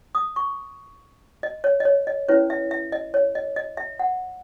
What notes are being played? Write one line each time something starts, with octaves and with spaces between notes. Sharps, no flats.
D#6
C#6
D#5
C#5
D#5
C#5
D#5
C#4 E4 B4 C#5
E5
E5
D#5
C#5
D#5
D#5
E5
F#5